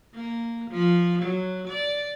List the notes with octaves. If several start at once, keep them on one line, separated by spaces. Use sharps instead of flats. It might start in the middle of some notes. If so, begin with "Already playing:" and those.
A#3
F3
F#3
D5